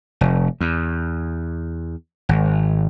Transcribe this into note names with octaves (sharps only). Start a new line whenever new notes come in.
F1
E2
G#1